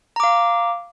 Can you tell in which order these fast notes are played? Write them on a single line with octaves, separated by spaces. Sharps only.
A#5 D6 F5